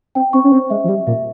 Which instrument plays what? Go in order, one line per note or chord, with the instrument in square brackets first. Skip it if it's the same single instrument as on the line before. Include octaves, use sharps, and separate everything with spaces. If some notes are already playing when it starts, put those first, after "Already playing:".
[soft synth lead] C4 [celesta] G5
[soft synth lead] C4 [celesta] C#6
[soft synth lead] C#4
[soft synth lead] C4 [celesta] C5
[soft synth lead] G#3 [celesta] E5
[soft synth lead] F3
[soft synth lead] G3 [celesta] E5
[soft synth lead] A#2 [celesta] E5